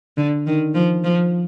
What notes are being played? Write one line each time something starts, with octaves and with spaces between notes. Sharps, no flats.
D3
D#3
F3
F3